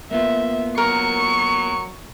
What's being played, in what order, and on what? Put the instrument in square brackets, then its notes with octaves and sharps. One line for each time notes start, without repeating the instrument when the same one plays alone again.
[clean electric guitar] A#3 B3 F4 [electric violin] E5
[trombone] F#3 [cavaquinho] A#4 [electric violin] C#6 C#7